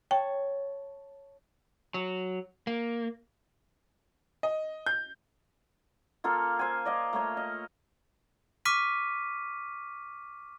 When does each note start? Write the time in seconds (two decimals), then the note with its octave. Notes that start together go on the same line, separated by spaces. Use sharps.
0.11 C#5 G5 A5
1.94 F#3
2.67 A#3
4.43 D#5
4.86 G6
6.24 A#3 F4 A4 F5
6.59 C5 G#5
6.85 D5 D#5 F5
7.13 A3 A#3 C#5
7.37 D#5
8.65 C#6 D6 F6 B6 D#7